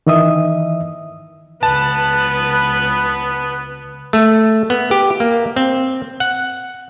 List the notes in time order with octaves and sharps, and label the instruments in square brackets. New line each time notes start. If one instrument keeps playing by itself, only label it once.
[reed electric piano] D#3 E3 D#5 E5 D#6
[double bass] C#2 [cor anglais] B3 [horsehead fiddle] B4 [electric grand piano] A5
[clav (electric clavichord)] A3
B3
G4
A#3
C4
F#5